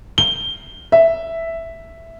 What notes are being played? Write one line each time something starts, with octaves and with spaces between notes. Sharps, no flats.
G7
E5